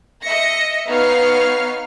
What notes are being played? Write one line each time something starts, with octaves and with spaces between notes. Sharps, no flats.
D#5 E5 A#6 C#7
B3 D#4 C#5 F5 F6 C7